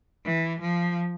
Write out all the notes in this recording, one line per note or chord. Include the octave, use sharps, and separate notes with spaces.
E3
F3